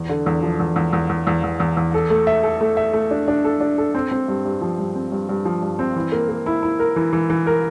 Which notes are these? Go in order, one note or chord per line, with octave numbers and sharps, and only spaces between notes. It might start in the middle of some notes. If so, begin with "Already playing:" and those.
Already playing: E2
D3
E2
F3
E2
E2
E2
E2
E2
E2
E2
E2
A4
A3
E5
A4
A3
E5
A3
D4
D4
A4
D4
A4
C4
C4
G2
G2
F3
G2
C4
G2
G2
F3
G2
C4
E3
A#3
A#3
E4
E4
A#4
E3
E3
E3
A#4